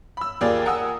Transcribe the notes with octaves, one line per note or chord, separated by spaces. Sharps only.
B5 E6
D#2 A#3 F4 G4 G#4 D5
A#4 F#5 G#5 D#6 E6